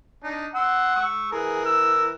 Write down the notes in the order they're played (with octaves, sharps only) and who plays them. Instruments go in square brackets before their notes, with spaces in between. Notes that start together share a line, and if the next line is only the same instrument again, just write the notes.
[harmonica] D4 D#4
[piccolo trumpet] F#5 [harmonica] C6 E6
[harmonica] C#6 E6
[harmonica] E3 A#4 [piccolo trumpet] G#4
[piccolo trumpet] E6